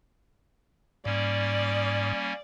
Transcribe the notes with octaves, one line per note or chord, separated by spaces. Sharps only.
G#2 G3 A#3 C#4 D5